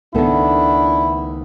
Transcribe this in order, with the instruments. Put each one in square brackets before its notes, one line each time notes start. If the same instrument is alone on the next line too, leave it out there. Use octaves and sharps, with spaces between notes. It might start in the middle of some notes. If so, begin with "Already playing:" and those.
[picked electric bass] C#2 D#3 [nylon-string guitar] B3 A4 [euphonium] D4 [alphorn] E4